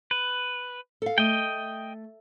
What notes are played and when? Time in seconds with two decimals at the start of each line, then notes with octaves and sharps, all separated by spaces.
0.11 B4
1.02 A4 F5
1.18 A3 D#5 G5